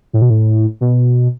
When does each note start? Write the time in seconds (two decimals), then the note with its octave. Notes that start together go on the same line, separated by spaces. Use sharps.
0.13 A2
0.22 B2
0.30 A2
0.81 B2